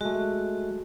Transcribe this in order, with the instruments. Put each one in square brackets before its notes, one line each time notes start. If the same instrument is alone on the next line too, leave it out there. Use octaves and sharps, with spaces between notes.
[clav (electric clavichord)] G#3 A3 [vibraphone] F#4